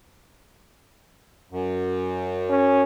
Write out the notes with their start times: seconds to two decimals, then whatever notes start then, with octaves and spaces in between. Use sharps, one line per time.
1.51 F#2
2.50 C#4